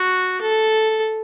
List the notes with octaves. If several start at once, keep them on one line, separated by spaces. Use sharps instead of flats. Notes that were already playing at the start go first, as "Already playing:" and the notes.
Already playing: F#4
A4